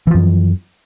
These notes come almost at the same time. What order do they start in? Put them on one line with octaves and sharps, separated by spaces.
E3 F3 F#2